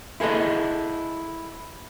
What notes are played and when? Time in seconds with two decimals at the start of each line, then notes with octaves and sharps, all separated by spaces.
0.20 E4 G#4 A4 B4 D#5